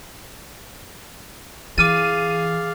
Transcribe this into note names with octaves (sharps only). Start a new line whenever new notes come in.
E3 G#4 F5 D6 F6 A6 D#7